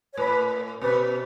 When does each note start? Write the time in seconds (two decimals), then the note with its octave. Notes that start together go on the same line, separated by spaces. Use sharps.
0.13 C#5
0.17 A2 B4
0.81 B2 B4